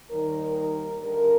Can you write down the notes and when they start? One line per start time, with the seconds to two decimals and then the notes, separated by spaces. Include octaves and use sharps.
0.10 D#2 D#3 G3 A#4
0.55 A#4
1.01 G2 D3 G3 A#4